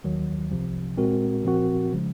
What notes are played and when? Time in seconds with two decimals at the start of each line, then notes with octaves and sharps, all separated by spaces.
0.04 D#2 D#3 F#3
0.51 C2 C3 F3
0.97 A#2 G#3 C4 F#4 A#4
1.44 A#2 F3 C4 F#4 A#4
1.93 C#3 F3 G#3